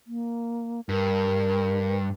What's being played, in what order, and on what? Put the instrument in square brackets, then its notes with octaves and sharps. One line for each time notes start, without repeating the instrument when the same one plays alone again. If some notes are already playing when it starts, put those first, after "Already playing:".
[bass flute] A#3
[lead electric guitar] G2 [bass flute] A#4